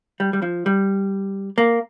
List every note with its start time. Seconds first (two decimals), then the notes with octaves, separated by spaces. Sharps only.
0.20 G3
0.33 G3
0.42 F3
0.66 G3
1.58 A#3